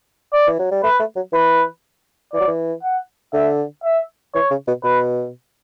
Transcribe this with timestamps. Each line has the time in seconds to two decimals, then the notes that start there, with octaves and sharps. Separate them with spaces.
0.33 D5
0.47 E3
0.59 F#3
0.71 G3
0.83 A3 B4
1.00 A3
1.16 F#3
1.33 E3 B4
2.33 E3 D5
2.40 F#3
2.48 E3
2.83 F#5
3.33 D3 E5
3.84 E5
4.34 E3 C#5
4.51 C#3
4.67 B2
4.84 B2 B4